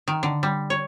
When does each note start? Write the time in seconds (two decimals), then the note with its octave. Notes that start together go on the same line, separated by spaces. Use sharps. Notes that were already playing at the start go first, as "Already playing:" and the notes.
0.08 D#3
0.23 D3
0.43 G3
0.70 C#5